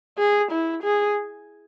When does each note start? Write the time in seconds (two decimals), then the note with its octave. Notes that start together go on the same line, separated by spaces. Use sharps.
0.18 G#4
0.51 E4
0.83 G#4